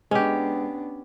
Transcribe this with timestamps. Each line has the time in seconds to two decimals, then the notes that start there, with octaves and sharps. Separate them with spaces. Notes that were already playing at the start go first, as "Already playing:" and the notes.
0.11 G#3 B3 C#4 D4 G4